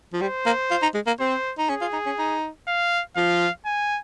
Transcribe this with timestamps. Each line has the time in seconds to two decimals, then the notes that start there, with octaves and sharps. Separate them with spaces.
0.13 F3
0.21 G3 C5
0.46 A#3
0.71 F4
0.82 D#4
0.94 G#3
1.07 A#3
1.19 C4 C5
1.58 D#4
1.69 C#4 G#4
1.81 F4
1.93 D#4
2.06 C#4
2.18 D#4
2.68 F5
3.16 F3 F5
3.65 G#5